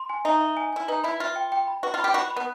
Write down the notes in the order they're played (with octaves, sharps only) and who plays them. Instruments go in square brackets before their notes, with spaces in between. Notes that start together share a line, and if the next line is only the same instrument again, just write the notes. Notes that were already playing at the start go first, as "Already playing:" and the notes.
Already playing: [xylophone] C6
G#5
[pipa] D#4 [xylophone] E5
[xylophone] E5
G#5
[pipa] E4 [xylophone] G#5
[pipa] D#4 [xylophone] B4
[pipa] E4 [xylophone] B5
[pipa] F4 [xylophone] E5
[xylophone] G5
G5
B5
[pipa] F#4 [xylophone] B4
[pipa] F4
[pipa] G4 [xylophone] B5
[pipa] F#4 [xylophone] B5
[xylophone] B5
[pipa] B3